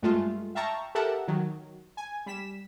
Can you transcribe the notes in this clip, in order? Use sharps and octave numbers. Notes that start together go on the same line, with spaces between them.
G2 G#3 A3 F4
E5 F5 G5 A5 A#5 C#6
G4 A4 A#4 E5 F#5 A5
D#3 F#3
G#5
G3 B6 E7